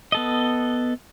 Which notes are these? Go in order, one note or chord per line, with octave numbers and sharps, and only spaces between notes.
B3 A4 D#5